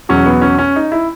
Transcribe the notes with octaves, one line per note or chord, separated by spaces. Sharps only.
E2 B2 F#3 C#4
B3
C#4
C#4
D#4
E4